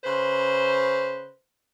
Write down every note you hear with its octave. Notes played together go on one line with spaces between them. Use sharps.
C#3 B4 C5